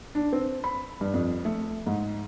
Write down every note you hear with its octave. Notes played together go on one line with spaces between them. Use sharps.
D4
C4
B5
G2
F2
A3
G#2